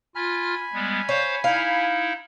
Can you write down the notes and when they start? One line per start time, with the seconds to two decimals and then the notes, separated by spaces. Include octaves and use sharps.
0.15 F4 G#5 B5 F6
0.73 G3 G#3 B3
1.09 C5 C#5 F5
1.44 D#4 E4 F5